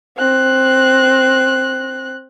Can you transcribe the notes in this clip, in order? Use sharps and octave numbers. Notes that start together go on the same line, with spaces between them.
C4 F#6